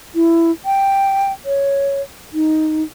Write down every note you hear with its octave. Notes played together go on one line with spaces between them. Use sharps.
E4
G5
C#5
D#4